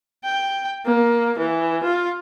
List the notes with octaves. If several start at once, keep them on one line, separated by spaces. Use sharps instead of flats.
G5
A#3
E3
F4